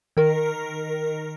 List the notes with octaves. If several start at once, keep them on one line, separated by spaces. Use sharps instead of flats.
D#3 A#4